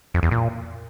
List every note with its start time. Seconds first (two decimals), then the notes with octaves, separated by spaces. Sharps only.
0.14 F2
0.23 E2
0.31 A#2